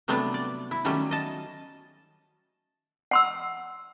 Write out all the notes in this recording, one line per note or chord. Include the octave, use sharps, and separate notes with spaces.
C3 F#3 G3 A3 B3 D4
D5
E4
D#3 F#3 G3 A3 C#4
D#5 A5
F#5 C6 E6